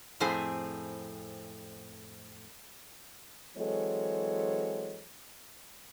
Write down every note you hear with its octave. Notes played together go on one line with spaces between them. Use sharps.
F2 A2 C4 G#4 G#5
E3 F#3 G#3 C4 A4 C#5